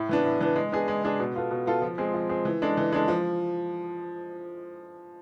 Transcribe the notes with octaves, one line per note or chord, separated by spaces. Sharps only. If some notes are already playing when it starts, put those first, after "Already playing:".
Already playing: A2
E3 B3 D4
A2
E3 B3 D4
G#3
B3 D4 G#4
G#3
B3 D4 G#4
B2
B3 F4 A4
B2
B3 F4 A4
F3
G#3 C4 G#4
F3
G#3 C4 G#4
E3
G#3 D4 A4
E3
G#3 D4 A4
F3